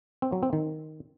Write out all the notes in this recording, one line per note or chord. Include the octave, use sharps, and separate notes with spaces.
C4
F#3
C4
D#3